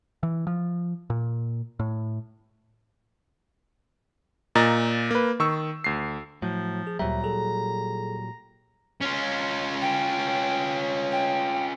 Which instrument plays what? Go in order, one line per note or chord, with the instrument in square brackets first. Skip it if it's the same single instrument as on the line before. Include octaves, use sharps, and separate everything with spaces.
[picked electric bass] E3
F3
A#2
A2
[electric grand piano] A#2 D#5 A#5 A6
A#3 B4
D#3 C#6 E6
D2 C7
[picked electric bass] A2 F#3 [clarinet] F3
[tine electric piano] G#4
[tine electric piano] D2 E5 [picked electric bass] A#2 F#3 G3 [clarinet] A#5
[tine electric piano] G#4 A4
[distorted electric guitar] C#4 F4
[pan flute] G5
G5